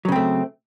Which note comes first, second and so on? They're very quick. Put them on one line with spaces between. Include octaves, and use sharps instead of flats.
F#3 C#3 C4 A3